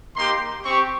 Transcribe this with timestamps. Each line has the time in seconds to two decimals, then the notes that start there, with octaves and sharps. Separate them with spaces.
0.16 A#3 D#4 G4 C6
0.65 C4 G4 C#6